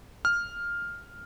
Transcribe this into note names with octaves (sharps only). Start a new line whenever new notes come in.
F6